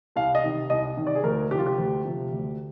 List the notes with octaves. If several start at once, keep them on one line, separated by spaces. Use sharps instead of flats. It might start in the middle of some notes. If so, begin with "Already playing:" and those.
C2 F5
D#5
C3 D#3
C2 D#5
C3 D#3
D5
G#4
D2 A#4
C3 F3 F4 G4
G4
D2
C3 F3
D2